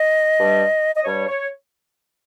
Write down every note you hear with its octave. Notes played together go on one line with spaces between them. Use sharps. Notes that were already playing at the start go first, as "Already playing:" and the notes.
Already playing: D#5
G2 G3
D#5
G2 G3 C#5
C#5